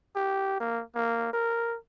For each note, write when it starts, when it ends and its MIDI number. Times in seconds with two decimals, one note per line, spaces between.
0.16 0.60 67
0.60 0.82 58
0.95 1.29 58
1.33 1.77 70